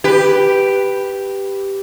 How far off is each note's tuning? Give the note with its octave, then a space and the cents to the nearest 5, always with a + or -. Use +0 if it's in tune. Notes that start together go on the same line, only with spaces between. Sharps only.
G4 +0 B4 +0